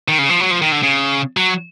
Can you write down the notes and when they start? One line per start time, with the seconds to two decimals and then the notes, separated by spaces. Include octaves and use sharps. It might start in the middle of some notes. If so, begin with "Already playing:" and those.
0.08 D#3
0.19 C#3
0.29 F3
0.40 F#3
0.51 F3
0.62 D#3
0.72 D3
0.83 C#3
1.37 F#3